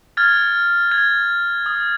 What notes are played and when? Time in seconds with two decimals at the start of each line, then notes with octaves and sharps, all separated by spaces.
0.17 F6 G#6 A6
0.92 G#6
1.66 D#6